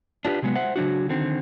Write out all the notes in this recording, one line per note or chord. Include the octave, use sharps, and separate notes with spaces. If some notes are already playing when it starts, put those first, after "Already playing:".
D4 F4 G4 A#4 B4
C3 F#3 G#3 B3
C5 E5 F#5
C#3 F#3 D4 F#4
D3 D#3 C4